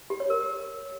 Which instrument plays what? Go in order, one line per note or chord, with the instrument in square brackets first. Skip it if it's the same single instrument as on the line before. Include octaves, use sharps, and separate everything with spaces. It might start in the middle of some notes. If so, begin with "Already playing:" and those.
[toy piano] G4
C#5
A#4